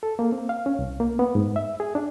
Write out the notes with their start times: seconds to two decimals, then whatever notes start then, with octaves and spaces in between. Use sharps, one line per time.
0.03 A4
0.19 A#3
0.32 C4
0.49 F5
0.66 C#4
0.79 C2
1.00 A#3
1.19 B3
1.35 G#2
1.56 E5
1.80 G#4
1.95 D4